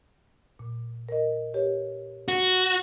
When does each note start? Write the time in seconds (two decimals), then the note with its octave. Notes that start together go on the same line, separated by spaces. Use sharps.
0.59 A#2
1.09 A#4 D#5
1.54 G4 B4 C#5
2.28 F#4